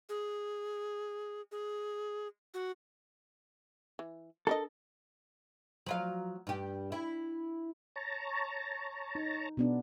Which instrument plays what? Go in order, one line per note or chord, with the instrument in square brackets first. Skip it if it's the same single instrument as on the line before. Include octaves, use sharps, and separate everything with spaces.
[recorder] G#4
G#4
F#4
[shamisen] E3
[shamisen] D4 A#4 D#5 [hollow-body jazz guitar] A4
[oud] F3 F#3 F5
G2 G4
E4
[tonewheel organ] C#5 A5 A#5
[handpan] D#4
B2 B3 D4